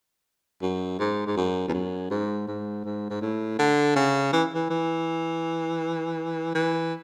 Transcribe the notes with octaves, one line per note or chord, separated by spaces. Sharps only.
F#2
G#2
G#2
F#2
E2
F#2
G#2
G#2
G#2
G#2
A2
D3
C#3
E3
E3
E3
E3